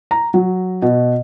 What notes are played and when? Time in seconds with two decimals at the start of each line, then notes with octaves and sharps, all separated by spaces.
0.11 A#5
0.34 F#3
0.82 B2